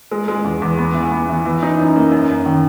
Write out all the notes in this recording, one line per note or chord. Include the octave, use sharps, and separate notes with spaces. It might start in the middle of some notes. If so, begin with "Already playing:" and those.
G#3
G#3
E2
E2
B3
E3
B3
E3
E3
D#4
F#2
A#3
F#2
F#2
D#3